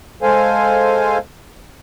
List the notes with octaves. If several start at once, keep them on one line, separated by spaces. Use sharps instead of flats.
G#3 A4 C5 F5 G#5